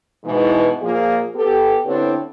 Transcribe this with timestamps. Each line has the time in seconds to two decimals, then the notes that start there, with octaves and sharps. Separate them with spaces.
0.24 G#2 B2 E3
0.81 A#2 F3 A#3 F4 G#4
1.35 B3 G4 A4
1.85 D3 B3 C4 D4 E4 C#5